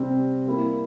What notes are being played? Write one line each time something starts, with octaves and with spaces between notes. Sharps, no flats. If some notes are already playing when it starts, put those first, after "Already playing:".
Already playing: C3 G3 C4 G4
G3 A#3 E4